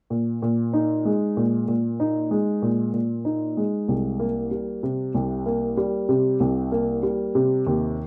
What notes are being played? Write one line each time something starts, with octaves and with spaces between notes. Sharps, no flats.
A#2
A#2
D#4
G#3
A#2
A#2
D#4
G#3
A#2
A#2
D#4
G#3
C2
A#3
G3
C3
C2
A#3
G3
C3
C2
A#3
G3
C3
D#2